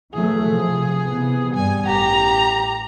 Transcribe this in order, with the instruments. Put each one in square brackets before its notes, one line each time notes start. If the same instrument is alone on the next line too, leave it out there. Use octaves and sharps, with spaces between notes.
[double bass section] E3 F#3 A3 [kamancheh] G#4
[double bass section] C3 F3
C3 E3 B3
[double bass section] G2 G3 [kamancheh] G#5
[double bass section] A1 [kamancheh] G4 A#5